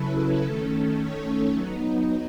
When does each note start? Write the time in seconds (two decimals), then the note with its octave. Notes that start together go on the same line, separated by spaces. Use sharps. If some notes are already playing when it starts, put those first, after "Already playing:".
Already playing: C#3 F#3 C#4 E4 A4 B4
0.45 D#3 A3 C#4 A4
1.00 C#5
1.54 F#3 B3 D#4